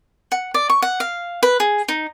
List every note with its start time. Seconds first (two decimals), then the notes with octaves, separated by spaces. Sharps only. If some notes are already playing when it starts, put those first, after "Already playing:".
0.32 F#5
0.54 D5
0.70 C#6
0.82 F#5
1.00 F5
1.43 B4
1.60 G#4
1.88 D#4